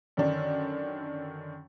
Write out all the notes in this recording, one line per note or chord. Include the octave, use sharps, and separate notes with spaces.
F#2 D3 D#3 D4